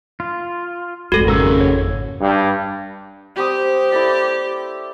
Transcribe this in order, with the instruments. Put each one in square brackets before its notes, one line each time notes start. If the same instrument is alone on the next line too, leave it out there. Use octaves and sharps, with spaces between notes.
[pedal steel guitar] F4
[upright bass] G#1 F2 [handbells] F#4 A4
[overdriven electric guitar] F#2 C#3 [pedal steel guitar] A#4 E6
[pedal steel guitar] C#5
[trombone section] G2
[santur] G3 C4 D#6 [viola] G4
[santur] E4 A4 D5